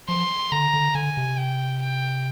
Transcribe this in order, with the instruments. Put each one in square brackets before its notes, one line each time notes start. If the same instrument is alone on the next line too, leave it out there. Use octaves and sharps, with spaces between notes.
[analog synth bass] F3 [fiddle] C6
[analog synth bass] D3 [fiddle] A#5
[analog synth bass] D3
[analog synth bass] D3 [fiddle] G#5
[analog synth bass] C3
[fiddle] G5
G5